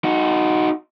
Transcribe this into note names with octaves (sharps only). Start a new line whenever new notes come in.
D#4 F#4